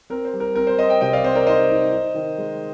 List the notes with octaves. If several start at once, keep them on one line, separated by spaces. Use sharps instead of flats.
C4 A#4
C5
G3
A#4
C4 A#4
C5
C4 C5 D#5
D#5 G5
C3 D#5 G5
D5 F5
C4 C5
A#4 D5
D#4 C5 D#5
D#4
D#4
D#3
G#3